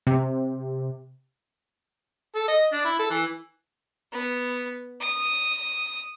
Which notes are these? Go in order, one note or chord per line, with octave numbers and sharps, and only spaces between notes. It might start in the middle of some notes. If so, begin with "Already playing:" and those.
C3
A4
D#5
D4
E4
A4
E3
B3
D#6